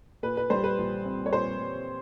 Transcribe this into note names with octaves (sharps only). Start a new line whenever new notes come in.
A#2 B4
B4
G3 C5
B4
A#1
C4
C#5
A#2 C5
G3